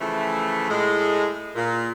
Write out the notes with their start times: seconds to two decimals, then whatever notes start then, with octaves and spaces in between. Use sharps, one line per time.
0.01 C#3 E3 F3 A3
0.70 A2 G#3
1.56 A#2